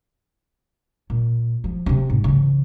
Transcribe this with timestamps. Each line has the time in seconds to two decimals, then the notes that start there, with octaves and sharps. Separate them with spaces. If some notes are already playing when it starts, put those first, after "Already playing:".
1.10 A#2
1.64 F3
1.86 C3 C4
2.10 G#2
2.24 C#3 E3